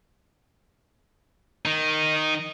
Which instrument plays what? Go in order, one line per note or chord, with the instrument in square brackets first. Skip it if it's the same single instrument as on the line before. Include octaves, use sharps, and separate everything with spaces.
[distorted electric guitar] D#3 D#4